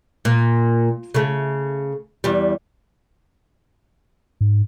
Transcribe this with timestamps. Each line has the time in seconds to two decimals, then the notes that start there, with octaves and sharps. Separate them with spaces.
0.25 A#2
1.14 C#3 A3
2.24 E2 G3
4.41 G#2